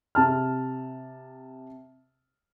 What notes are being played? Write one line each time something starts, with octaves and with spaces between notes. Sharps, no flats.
C3 A5 F6